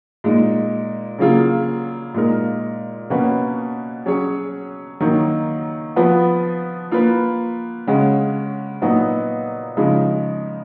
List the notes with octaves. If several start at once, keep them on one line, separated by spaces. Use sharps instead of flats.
A#2 G#3 D#4
C#3 F#3 A#3 F4 G#4
A#2 G#3 D#4 A#4
B2 A#3 C#4 F#4 B4
F#3 C#4 G#4 C#5
D#3 F#3 A#3 D#4
F3 B3 F#4 B4
A#3 F4 B4
C#3 G#3 C#4 F#4
A#2 F#3 B3 D#4 F#4
C#3 F3 G#3 D#4